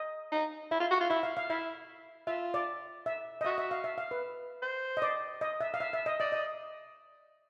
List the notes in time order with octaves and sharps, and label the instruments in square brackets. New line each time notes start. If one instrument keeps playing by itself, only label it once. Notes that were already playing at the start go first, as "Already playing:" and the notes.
Already playing: [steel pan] D#5
[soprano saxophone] D#4
[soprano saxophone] E4 [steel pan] E5
[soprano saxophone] F4
F#4
F4
[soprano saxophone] E4 [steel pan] E5
[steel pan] F5
F5
[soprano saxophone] E4 [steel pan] E5
[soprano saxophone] F4 [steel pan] E5
[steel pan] D5
E5
D#5
[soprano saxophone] F#4 [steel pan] E5
[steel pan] E5
F5
E5
F5
B4
[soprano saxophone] C5
[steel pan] D#5
D5
D#5
E5
F5
E5
E5
D#5
[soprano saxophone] D5 [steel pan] D#5
[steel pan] D#5